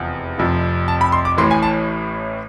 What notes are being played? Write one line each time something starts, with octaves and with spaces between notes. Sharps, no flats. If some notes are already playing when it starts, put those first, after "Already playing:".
Already playing: F1 E2 C3 F3
F1 F2 C3 F3
A5
B5
C6
D6
A1 A2 E3 C6
G#5
A5